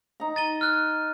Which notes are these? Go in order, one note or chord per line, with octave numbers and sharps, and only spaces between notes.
D#4 A#5
A6 D#7 G7
F6 F#6